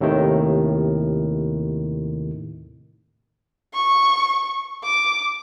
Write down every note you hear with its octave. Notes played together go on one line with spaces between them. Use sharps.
D#2 A2 C3 D#3
C#6
D6